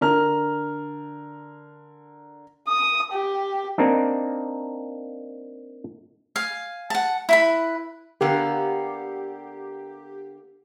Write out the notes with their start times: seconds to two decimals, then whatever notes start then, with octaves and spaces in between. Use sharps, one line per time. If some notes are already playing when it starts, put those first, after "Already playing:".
0.01 D3 A#4 A#5 F6
2.68 D#6
3.12 G4
3.78 A#3 C4 D4 D#4
6.36 F5 G#5
6.90 F#5 A5
7.29 E4 B4 B5
8.21 D3 A#3 B3 G4